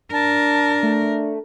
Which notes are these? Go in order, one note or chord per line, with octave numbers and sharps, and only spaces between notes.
D4 A#4 A5
A3